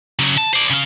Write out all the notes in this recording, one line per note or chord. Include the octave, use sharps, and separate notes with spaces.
C#3 F#3
A5
C5 D5
C#3 F5